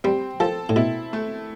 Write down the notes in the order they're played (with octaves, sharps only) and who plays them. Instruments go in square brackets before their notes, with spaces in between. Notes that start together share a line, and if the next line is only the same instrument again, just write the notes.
[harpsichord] G3 [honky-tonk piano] C4
[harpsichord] F3 [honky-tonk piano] A4
[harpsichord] A2
[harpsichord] B2 [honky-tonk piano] E4
[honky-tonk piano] A3